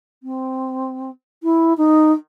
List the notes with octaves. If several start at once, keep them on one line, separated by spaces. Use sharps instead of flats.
C4
E4
D#4